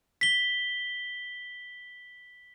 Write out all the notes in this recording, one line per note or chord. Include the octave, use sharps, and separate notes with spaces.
B6 G7